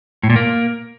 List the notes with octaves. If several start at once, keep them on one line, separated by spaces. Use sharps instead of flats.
A2
A#2
A#3